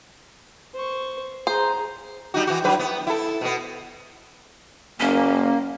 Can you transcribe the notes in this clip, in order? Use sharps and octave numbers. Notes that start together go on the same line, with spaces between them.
C5 C#6
G#4 C5 A#5
G3 D#4 F#4
E3 F#4
G2 F#3 B4
B3
E4 A4
B2 B3
F#1 A#3 C#4